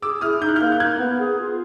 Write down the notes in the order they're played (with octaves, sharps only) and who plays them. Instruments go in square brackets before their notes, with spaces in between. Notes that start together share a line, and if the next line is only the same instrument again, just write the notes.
[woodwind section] G#4 [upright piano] D6 E6
[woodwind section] E4 [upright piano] D#6 F6
[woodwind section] D#4 [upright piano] G6
[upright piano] F#6
F6 G6
[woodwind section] A#3
[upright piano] G6
[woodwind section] D#4 [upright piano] F#6 G#6
[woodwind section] B3
G#4
F4